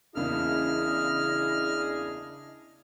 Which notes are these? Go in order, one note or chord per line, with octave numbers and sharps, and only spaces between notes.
E2 C#3 A#3 D4 E4 G#4 D#5 F6